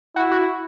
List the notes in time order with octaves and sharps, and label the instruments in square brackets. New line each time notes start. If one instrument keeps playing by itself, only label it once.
[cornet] E4 [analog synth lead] F#4
[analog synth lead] F#4